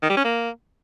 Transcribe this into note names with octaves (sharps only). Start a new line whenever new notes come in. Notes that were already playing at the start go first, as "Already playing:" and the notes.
D#3
G3
C#4
A#3